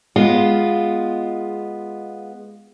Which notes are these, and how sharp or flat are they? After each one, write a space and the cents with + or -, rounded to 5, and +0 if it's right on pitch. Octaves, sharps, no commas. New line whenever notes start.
G#3 +0 B3 -5 F4 +0